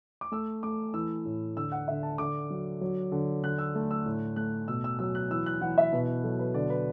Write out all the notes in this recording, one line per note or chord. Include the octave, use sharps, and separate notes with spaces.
D6
A3 E6
A3 D6
E3 E6
A2
D3 E6
F#5
D3 E5
A5
D3 D6
F#3
F#3
D3
D3 F#6
E6
A3
E6
A2
A3 F#6
B2 E6
E6
F#3 E6
F#6
E3 E6
F#6
E3 F#5
E5
B2 B4
F#3 A4
B4
D3 D5
B4